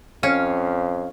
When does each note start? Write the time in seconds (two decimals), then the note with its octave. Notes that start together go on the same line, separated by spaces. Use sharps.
0.23 F2 C#4 F5